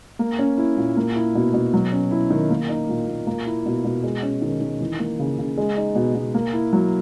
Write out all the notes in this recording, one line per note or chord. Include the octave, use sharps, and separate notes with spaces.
A#3
C#4
E4
A#2
A#3
E4
B2
B2
F#3
C#4
E4
D#3
A#3
D#4
A#2
A#2
A#3
E4
B2
B2
G#3
C#4
D#3
D#3
E3
A#3
C#3
C#3
G#3
D#4
B2
B2
A#3
E4
F#3